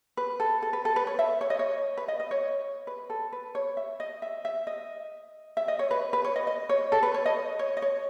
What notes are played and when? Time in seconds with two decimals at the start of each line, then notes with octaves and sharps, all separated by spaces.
0.17 B4
0.40 A4
0.62 A4
0.73 B4
0.85 A4
0.96 B4
1.07 C#5
1.19 E5
1.41 C#5
1.50 D#5
1.59 C#5
1.97 B4
2.08 D#5
2.20 D#5
2.31 C#5
2.87 B4
3.10 A4
3.33 B4
3.55 C#5
3.77 E5
4.00 D#5
4.22 E5
4.45 E5
4.67 D#5
5.57 E5
5.68 D#5
5.79 C#5
5.91 B4
6.13 B4
6.24 C#5
6.36 D#5
6.47 D#5
6.69 C#5
6.92 A4
7.03 B4
7.14 C#5
7.26 D#5
7.59 C#5
7.77 D#5
7.82 C#5